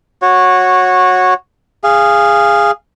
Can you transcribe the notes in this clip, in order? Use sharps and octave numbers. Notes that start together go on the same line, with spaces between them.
F#4 C#5
G#4 F5